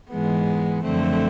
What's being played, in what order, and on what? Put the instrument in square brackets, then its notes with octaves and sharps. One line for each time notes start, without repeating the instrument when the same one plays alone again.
[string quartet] G#2 E3 G#3 B3
F#2 D3 F3 A3 C4